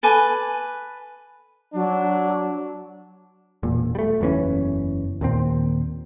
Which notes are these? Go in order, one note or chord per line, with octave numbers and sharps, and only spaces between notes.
A4 B4 G#5 D6
F#3 D4
E1 A#2
G3 A3
F#1 E2 E3 C#4
D#2 A#2 C4